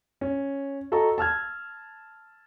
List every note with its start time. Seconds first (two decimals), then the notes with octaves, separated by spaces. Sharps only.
0.21 C#4
0.92 F#4 A4 D#5 A#5 C#6
1.18 A5 E6 F6 G#6